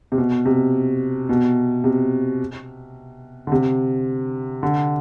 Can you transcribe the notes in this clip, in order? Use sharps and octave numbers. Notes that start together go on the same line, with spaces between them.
C3
B2
C3
B2
C3
D3
C3
D3